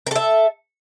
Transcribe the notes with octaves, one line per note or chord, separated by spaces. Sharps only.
A4 A#4 E5